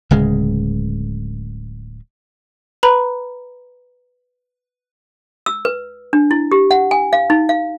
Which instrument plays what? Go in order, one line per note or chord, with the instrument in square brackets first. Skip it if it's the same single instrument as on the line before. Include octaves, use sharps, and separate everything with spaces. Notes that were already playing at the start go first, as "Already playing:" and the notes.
[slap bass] D1 C#3 G#3
[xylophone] B4 A#5 B5
[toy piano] E6
B4
D4
E4
G4
F#5
G#5
F5
D#4
F5